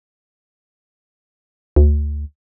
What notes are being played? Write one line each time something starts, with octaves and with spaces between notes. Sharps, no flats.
D2